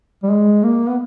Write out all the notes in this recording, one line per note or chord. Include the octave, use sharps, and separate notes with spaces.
G3
G#3
A#3
B3